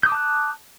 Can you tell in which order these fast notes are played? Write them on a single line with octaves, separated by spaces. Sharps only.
G6 D#6 D6 A5 F#6